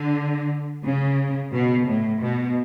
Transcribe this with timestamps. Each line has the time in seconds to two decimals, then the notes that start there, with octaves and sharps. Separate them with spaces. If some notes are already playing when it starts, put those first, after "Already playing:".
Already playing: D3
0.85 C#3
1.53 B2
1.89 A2
2.22 B2